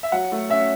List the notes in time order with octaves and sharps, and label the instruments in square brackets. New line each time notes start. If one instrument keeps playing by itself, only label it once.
[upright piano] E5
F#3 F#5
A3
C#4 E5